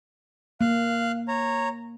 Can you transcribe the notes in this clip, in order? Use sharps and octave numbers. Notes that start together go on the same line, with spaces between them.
A#3 F5 F#6
C#5 A#5